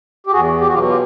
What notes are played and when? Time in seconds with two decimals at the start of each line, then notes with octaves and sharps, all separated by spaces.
0.27 G4
0.32 E2 F#4 G#4
0.60 G4
0.68 F#4
0.74 B2 F#3 F4 G4
0.88 F4 G4